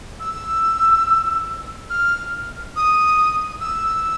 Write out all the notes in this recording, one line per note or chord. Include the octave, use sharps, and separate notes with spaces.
E6
F6
D#6
E6